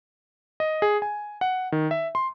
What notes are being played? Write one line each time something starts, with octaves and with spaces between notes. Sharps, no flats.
D#5
G#4
G#5
F#5
D#3
E5
C6